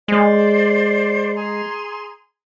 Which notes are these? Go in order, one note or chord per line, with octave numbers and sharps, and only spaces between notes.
G#3 C5 D5
G#4 A#5 C6